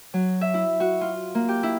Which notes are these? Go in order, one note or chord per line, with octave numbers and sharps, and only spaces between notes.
F#3
E5
E4
F#4
F4
A#3
G4
E4